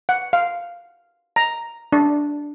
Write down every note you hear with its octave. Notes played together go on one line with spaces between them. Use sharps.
F#5
F5
A#5
D4